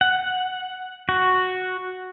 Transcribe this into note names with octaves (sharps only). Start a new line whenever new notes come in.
F#5
F#4